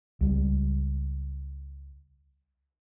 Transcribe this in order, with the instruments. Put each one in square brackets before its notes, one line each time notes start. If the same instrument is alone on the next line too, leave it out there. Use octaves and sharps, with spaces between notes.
[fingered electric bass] C#2 G3